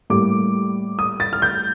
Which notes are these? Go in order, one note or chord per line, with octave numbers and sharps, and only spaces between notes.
A2 G3 A#3 D6
D#6
A6
F6
G6